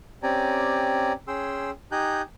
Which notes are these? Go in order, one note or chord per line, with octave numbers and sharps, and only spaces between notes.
C4 C#4 G4 D5 G#5 A#5
C#4 G#4 G5 C6 E6
D#4 G4 G#5 A#5 F#6 G6